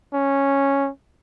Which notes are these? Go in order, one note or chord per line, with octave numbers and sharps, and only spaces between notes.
C#4